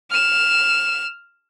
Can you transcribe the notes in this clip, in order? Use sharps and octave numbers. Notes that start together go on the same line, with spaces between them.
F6 E7